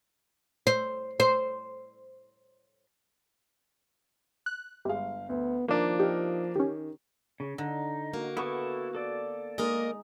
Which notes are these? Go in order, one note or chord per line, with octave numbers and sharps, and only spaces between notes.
C5
C5
F#6
G1 G3 G#3 F5
D2 B3
D#3 F3 A#3 D4
D#4 G4 A#4
D#3 C#4 G4
C#3
D3 D#4
A#3 F#4
B3 E4 A4 C#6
A4 D5
G#3 A#3 D#4 A#4 D#5